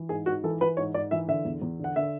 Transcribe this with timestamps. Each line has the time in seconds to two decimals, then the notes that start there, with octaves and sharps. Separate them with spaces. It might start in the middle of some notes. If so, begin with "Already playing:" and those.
Already playing: E3
0.09 G#2 G#4
0.26 G#2 F#4
0.44 E3 A4
0.61 E3 B4
0.77 G#2 C#5
0.94 G#2 D5
1.11 E3 E5
1.28 D3 E5
1.45 E2
1.62 E2
1.79 D3 F#5
1.96 D3 E5